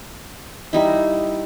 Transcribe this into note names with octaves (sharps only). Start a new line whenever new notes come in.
G3 D#4 E4